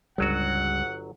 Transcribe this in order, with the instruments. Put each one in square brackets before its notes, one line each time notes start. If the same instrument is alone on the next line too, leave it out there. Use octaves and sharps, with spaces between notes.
[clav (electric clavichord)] G1 F#3 F#4 [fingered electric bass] C#2 G3 [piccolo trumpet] F#5